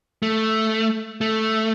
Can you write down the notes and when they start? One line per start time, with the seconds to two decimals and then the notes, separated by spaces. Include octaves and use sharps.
0.23 A3
1.21 A3